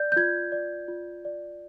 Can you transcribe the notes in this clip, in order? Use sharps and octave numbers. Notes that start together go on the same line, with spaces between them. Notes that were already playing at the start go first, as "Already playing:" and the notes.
Already playing: D5 G6
G6
F4 G#6
D5
F4
D5